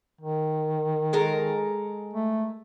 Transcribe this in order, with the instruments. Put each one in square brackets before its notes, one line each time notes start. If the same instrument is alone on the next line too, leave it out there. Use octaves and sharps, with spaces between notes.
[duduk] D#3
[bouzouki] G#3 A4 A#4
[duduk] A3